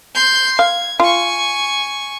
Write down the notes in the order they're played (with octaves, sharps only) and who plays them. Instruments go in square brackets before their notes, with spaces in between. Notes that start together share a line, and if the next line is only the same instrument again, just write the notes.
[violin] C6 G6
[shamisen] F5 [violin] G#6
[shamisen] F4 [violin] G#5 C#6